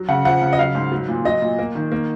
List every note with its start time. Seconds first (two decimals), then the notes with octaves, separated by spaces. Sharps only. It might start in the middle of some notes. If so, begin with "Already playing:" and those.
Already playing: F#3
0.09 C#3 F#5
0.25 F3 F#5
0.42 C#3
0.53 D#5
0.58 F#3 F5
0.75 G#2
0.92 F#3
1.08 A#2
1.25 F#3 D#5
1.42 A#2
1.58 A#3
1.75 D#3
1.92 A#3